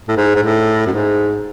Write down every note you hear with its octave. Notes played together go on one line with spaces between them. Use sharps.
A2
G#2
G#2
A2
F#2
G#2